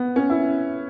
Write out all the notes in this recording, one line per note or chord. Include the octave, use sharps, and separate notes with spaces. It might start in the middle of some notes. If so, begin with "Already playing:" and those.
Already playing: B3
C#4
E4